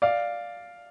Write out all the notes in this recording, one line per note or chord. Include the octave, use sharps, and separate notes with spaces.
D5 F5